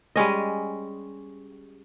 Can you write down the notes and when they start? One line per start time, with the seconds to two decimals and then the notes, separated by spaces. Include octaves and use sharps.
0.16 G3 G#3 C#4 D#5